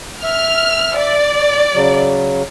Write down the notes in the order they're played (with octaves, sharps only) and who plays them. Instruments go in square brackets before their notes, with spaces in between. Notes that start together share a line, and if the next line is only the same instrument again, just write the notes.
[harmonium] E5 [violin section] F6
[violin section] D5
[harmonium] C#3 F#3